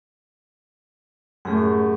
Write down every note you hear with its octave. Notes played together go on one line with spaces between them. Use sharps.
F#2 A2 G4 G#4 F#5